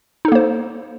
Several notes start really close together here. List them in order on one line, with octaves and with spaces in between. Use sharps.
D#4 A4 A#3 C5